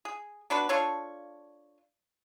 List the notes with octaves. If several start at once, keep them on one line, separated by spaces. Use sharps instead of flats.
G#4
B3 D4 F#4 B4
D4 F4 A4 C#5